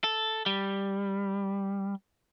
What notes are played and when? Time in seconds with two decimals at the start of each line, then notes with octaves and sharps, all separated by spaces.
0.04 A4
0.46 G3